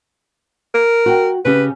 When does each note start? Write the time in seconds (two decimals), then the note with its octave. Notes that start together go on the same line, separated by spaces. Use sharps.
0.74 A#4
1.06 F#4 G5
1.45 C#3 C#4 G4 B4